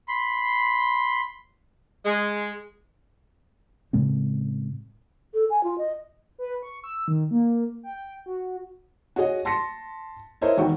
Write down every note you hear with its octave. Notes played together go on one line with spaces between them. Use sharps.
B5 C6
G#3
A2 C#3 G#3 C4
A4
G#5
F4
D#5
B4
C#6
E6
D#3
A#3
G5
F#4
F#4 G#4 C#5 D#5 F#5
A5 C6 A#6 B6 C#7
E4 A#4 C5 C#5 D#5 E5
E1 D#3 F#4 G5 C#6